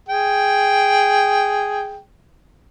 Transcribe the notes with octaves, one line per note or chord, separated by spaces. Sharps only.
G#4 G5